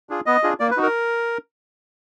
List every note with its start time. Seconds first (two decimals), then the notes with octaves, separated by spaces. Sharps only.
0.09 D4 F4 G#4
0.26 B3 D#5
0.43 D4 F4 G#4
0.60 A#3 D5
0.71 B4
0.77 D#4 F#4
0.83 A#4